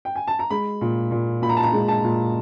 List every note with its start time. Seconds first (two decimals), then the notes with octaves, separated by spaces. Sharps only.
0.05 G5
0.15 G#5
0.28 A5
0.39 A#5
0.50 G#3 B5
0.81 A#2
1.11 A#2
1.42 A#2 B5
1.49 A#5
1.57 A5
1.63 A#5
1.73 G#3
1.88 A5
2.04 A#2